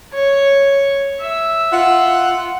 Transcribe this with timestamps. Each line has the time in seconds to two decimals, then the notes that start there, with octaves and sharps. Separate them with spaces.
0.13 C#5
1.20 E5
1.71 F4 F#5